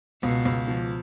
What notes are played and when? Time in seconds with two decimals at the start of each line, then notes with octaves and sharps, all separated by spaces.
0.23 C#2 B2
0.45 C#2
0.68 F3